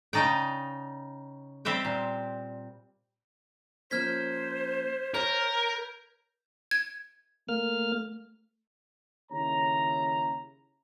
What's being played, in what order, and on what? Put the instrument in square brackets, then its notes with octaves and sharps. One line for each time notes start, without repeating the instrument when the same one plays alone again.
[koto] C#3 D#4 D5 G5
G3 C4 G4 E5 G5
A#2
[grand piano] F3 A#3 C#4 [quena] C5 [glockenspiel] F6 G#6 B6
[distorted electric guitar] A#4 [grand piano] C#5 [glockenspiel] G6
[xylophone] G#6
[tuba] A3 [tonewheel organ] A#3 F6
[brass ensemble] D#2 C#3 E4 C#5 A#5